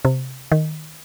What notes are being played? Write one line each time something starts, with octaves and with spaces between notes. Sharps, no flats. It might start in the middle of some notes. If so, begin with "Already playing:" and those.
C3
D#3